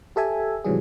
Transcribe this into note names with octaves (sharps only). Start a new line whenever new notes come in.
G4 A4 E5 G#5
G#2 C3 E3 F#3 G3 G#4